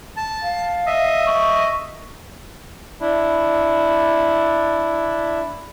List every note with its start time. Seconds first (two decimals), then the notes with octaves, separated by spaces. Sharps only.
0.17 A5
0.42 F5
0.86 D#5 E5
1.26 C#6
3.01 D4 E4